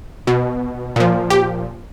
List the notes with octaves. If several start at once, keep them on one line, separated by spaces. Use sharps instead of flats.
B2
A#2 F3
G4